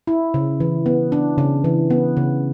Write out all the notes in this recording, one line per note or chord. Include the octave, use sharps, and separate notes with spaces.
E4
C#3
E3
B3
D4
C#3
E3
B3
C#3